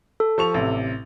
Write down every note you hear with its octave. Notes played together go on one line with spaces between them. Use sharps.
A4
F3 C#6 F7
A1 C3